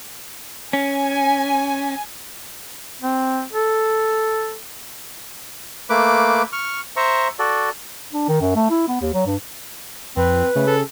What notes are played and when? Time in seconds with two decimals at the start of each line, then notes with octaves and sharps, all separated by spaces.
0.73 C#4 G#5
3.02 C4
3.53 A4
5.90 A3 A#3 B4 D6
6.53 C#6 F6
6.96 C5 E5 A#5 C#6
7.39 F#4 A4 D5
8.13 D4
8.29 D#3
8.41 F#2
8.56 A3
8.70 E4
8.88 B3
9.01 D#2
9.14 F#3
9.26 G2
10.17 F2 C4 B4
10.55 C#3 A3
10.67 A4